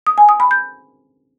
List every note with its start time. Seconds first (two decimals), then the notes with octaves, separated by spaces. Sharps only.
0.07 D#6
0.18 G#5
0.29 D#6
0.40 B5
0.51 G6